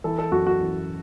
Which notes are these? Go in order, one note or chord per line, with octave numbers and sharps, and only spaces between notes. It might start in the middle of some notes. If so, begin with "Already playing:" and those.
E3 A4
A4
F#2 F#4
F#4
E3